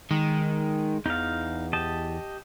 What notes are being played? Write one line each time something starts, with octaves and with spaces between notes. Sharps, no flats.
D#3 G#3
E2 D#4 F5
G4 D#5 A5